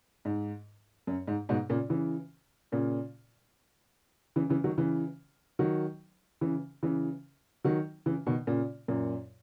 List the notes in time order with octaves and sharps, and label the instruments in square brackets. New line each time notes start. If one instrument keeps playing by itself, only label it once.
[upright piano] G#2
F#2
G#2
G#2 B2
A#2 C#3
C#3 E3
A#2 C#3
C#3 E3
C#3 E3
D#3 F#3
C#3 E3
D#3 F#3
C#3 E3
C#3 E3
D#3 F#3
C#3 E3
B2 D#3
A#2 C#3
F#2 A#2